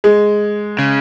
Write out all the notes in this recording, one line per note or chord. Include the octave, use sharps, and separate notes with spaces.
G#3
C#3